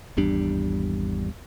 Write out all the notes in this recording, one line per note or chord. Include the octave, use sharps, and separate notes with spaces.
G#1 E2 G3 D4